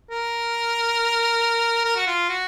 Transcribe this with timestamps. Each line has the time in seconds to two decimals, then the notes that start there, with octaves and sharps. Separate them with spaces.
0.11 A#4
1.85 A#4
1.96 F#4
2.07 F4
2.29 F#4